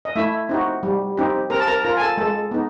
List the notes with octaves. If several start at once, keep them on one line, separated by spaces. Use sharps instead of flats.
D#5
A3 E4 E5
C4 D#4 F#4
G3
C4 D#4 G4
C4 A#4 A#5
A5
A#4 A#5
F4 A#4 A#5
G#5
A4 A5
G#3 A4 A5
B3 D#4